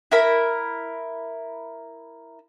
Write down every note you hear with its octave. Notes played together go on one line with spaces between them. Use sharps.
E4 A#4 B5